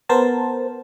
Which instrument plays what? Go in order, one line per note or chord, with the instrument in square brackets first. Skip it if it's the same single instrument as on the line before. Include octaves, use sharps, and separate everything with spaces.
[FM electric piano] B3 A#4 C5 A5